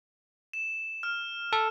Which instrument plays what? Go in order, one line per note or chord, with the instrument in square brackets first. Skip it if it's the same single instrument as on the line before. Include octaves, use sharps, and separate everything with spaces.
[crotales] E7
F6
[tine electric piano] A4